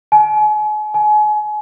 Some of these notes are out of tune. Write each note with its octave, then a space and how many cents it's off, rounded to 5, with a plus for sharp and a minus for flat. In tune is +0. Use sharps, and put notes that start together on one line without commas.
G#5 +40
G#5 +35